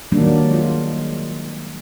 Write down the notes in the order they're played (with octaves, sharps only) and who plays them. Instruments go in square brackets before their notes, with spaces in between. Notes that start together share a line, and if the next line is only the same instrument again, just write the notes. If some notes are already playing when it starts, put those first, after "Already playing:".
[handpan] D#3 F#3 G3 A#3 D4
G#3 F4